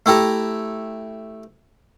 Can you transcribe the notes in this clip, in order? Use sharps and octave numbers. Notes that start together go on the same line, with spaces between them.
A3 E4 G4 A4 A#5